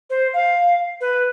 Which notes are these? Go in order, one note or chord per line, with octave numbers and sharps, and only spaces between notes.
C5
F5
B4